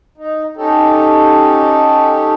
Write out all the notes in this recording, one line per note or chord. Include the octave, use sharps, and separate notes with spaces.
D#4
C#4 D#4 G4 A4